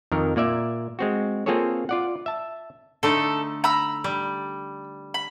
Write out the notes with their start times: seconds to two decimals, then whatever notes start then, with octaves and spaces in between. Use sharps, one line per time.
0.12 F2 D#3 A#4
0.36 A#2 A#3 D5 E5
0.99 G#3 C4 F#4
1.46 A#3 C4 F4 G#4 A4 C#5
1.89 F4 D5 F#5
2.26 E5 A5
3.03 D3 A3 D#4 A4
3.64 A#5 B5 E6
4.04 G3
5.14 B5